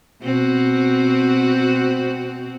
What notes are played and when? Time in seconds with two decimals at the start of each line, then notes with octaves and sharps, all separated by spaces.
0.22 B2 C4 F#4